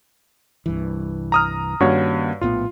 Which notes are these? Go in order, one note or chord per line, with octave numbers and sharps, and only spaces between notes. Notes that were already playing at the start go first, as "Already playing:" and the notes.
C2 G2 E3
A#5 D#6 F6
G2 D#3 A#3 C#4 F#4 C#5
A#1 A2 B3 F4